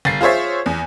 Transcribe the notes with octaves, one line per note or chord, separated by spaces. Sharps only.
G1 A6 C7
F4 G#4 C5 C#5 E5
E2